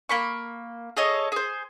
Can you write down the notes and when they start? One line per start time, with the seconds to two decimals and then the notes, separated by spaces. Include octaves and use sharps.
0.09 A#3 B5 C#6
0.97 G#4 A4 C#5 D#5
1.32 G#4 C5